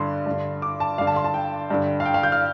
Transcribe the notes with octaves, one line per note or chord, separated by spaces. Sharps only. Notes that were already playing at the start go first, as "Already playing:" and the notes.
Already playing: G2 D3 C6
G2 D3
D6
A5
G2 D3 F5
A5
C6
A5
G5
G2 D3
F5
G5
F5
G6
F6